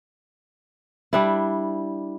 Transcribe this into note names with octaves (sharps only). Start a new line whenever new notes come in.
G3 D4 E4